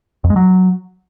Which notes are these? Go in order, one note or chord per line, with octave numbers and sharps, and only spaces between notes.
F2
G#3
F#3